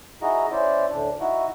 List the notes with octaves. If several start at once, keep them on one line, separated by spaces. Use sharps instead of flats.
D#4 E4 F#4 G#4 D#5 A#5
C#4 E4 C5 D5
D2 A2 D4
D#4 E4 F#4